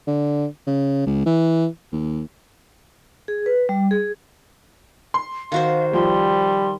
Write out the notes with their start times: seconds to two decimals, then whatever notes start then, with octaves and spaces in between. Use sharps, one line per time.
0.07 D3
0.67 C#3
1.07 C#2
1.26 E3
1.92 D#2
3.28 G#4
3.46 B4
3.69 G3
3.91 G#4
5.14 C6
5.52 D#3 F#4 C5 F5
5.93 F3 G3 C6